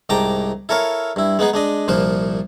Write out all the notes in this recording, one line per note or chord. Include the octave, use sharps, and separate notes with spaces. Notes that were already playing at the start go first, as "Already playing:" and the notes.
C2 G#2 G5 A5 A#5 D6
E4 A4 A#4 C#5 F5
G2 E4
G#3 B3 D#4 G#4
G#3 D4 D#5
C2 A#2 F3 F4 C5